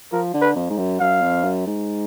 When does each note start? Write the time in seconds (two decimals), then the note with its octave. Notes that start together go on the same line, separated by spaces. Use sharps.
0.12 F3 A#4
0.34 D3
0.41 B4
0.56 F2
0.70 G#2
0.78 F#2
1.00 F#2 F5
1.22 F2
1.44 F#2
1.66 G#2